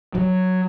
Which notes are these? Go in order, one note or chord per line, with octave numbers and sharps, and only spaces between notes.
F#3